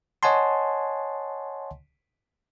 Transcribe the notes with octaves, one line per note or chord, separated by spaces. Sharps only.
C#5 D#5 F#5 G#5 A5 C6